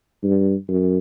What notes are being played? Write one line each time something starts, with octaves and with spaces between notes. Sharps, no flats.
G2
F#2